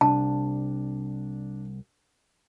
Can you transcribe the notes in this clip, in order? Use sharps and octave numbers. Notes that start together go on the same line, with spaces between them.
C2 D4 A5